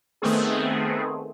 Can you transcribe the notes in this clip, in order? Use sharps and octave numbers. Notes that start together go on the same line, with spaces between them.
D#3 A3 B3 C4 G#4